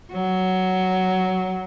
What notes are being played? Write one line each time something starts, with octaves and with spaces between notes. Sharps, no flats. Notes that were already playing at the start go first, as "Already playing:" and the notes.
F#3